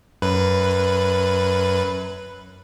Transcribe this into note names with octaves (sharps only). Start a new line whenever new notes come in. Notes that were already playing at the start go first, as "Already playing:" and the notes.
F#2 B4